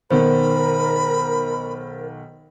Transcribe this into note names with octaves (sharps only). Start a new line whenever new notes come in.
B1 D#3 B3 A#4 C5 B5